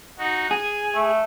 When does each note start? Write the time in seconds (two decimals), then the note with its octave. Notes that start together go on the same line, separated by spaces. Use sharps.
0.18 D#4 F#4
0.51 G#4 G#5
0.95 A3